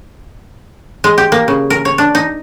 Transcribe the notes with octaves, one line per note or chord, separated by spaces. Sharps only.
G#3
G4
A#3
C#3
A#4
C#5
D4
D#4